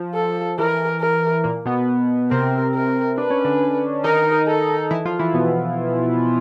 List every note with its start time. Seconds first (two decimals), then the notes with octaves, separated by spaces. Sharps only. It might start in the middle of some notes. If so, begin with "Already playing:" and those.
Already playing: F3
0.14 A4
0.58 E3 A#4
1.01 A#4
1.44 A#2 A#3
1.66 B2 B3
2.31 C3 C4 A#4
2.74 A#4
3.18 D4 B4
3.30 C#4
3.45 D3 D4
4.04 D#3 D#4 A#4
4.47 A4
4.91 E3 E4
5.05 F3 F4
5.19 E3 E4
5.34 B2 B3